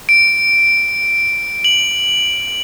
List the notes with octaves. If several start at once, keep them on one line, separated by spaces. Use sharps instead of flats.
D7
F#7